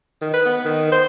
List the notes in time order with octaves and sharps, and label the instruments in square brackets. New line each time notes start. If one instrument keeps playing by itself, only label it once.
[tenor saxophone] D#3
B4
B3
D#3
C5